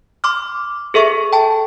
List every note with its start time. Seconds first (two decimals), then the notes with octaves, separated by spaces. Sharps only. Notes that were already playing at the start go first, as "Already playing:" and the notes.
0.24 C6 D6 F6
0.94 G#4 A4 E5 C#6
1.33 G5 A5